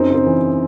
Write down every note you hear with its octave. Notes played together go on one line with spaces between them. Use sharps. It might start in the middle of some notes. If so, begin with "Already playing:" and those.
Already playing: F#2 C4 D#4
C#3
C4
E3